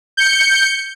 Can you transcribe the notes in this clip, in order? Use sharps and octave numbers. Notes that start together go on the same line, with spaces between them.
G6 C#7